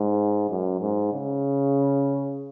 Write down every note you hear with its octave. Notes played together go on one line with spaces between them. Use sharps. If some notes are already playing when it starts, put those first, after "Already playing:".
Already playing: G#2
F#2
G#2
C#3